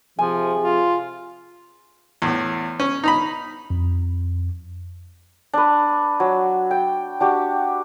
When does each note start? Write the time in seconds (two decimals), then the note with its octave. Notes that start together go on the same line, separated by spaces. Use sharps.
0.19 C3 F3 G#4 G#5
0.64 F4
2.22 E2 A2
2.80 C#4
3.04 D#4 A#5 B5
3.70 F2
5.53 D4 B4
6.20 F#3
6.71 G5
7.20 D4 F#4 G4